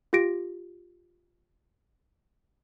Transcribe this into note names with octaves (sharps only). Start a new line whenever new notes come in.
F4 G4 A#6 D7